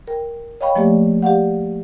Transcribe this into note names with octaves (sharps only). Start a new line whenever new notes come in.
A#4 G5
C#5 D#5 F5 G5 B5 C#6
F3 A3 A#3 G4 D5
G4 D5 F5 F#5